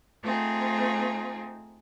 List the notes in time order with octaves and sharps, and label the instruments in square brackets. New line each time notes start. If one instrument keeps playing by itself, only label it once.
[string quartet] A3 C4 D#4 F4 G#4